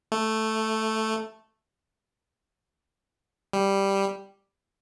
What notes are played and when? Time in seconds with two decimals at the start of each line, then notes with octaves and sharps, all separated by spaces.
0.12 A3
3.53 G3